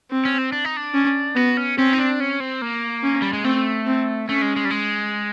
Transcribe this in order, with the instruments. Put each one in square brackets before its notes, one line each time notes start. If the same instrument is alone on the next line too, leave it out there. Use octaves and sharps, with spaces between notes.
[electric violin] C4
[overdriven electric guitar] C#4
C4
D4
D#4
D4
[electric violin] C#4
[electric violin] B3 [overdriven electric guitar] F#4
[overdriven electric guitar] C#4
[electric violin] C4 [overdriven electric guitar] C#4
[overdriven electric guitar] D#4
D4
C#4
C4
A#3
[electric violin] C#4
[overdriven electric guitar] G3
G#3
[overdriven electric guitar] A3 [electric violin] C4
[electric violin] C4
[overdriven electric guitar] A3 [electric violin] C#4
[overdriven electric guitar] G#3
G#3
G3
G#3